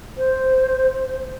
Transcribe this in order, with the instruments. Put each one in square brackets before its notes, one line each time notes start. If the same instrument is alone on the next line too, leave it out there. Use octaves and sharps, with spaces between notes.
[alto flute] C5